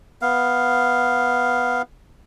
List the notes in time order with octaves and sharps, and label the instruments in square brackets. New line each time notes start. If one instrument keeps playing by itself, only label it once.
[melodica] B3 F5